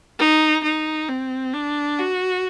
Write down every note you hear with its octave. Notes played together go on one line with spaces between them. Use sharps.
D#4
D#4
C4
D4
F#4